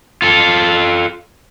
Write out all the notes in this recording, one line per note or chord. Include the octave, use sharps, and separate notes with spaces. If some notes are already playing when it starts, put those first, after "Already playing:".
F4 A4